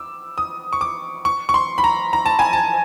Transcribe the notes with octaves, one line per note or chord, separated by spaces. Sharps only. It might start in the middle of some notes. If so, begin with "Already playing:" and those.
Already playing: D6 E6
D#6
C#6
D6
C#6
C#6
C6
B5
A#5
A#5
A5
G#5
A5